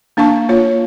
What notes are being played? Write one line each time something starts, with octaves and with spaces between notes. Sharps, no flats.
A#3 D4 F5 A5 C#6
A#3 F4 C#5